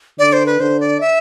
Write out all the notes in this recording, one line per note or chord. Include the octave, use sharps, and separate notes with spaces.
D3 D5
C5
B4
D3 C5
D5
E5